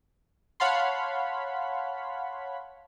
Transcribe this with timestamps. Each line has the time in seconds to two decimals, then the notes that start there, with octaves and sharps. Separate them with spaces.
0.60 C#5 F5 F#5 A5 B5 C6